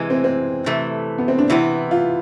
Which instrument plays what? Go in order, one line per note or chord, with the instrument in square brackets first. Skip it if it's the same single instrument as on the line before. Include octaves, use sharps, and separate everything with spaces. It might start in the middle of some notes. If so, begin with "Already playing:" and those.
Already playing: [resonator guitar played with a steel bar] C3 E3 G#3
[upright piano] C4
C4
[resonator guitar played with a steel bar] C3 E3 A3
[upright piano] B3
C4
D4
[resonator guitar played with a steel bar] C3 E3 B3 [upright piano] E4
[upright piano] F4